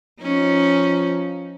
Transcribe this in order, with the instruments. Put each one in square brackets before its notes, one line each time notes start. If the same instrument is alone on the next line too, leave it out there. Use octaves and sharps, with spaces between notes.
[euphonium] F3 [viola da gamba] C#4 D#4